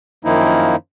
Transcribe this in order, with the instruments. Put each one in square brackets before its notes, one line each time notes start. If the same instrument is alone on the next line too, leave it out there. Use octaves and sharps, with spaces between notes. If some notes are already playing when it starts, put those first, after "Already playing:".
[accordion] F#2 D#3 F3 A#3 D#4 E4